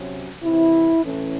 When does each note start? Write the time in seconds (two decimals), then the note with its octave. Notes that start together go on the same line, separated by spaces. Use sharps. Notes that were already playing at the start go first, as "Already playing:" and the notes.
Already playing: C3 F#3 C#4
0.42 C3 E3 C4 E4
1.03 A2 E3 A3 C#4